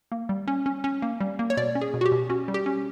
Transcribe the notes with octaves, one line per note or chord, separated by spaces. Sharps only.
A#3
G3
C#4
C#4
C#4
A#3
G3
A#3
C#5
B2 D5
C#4
G#4
B2
F#4
G4
B2
C#4 F#4
G3
G4
C#4